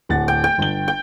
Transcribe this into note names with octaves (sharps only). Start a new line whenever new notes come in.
D1 F#5 A6
G5
G5
G1 G7
G5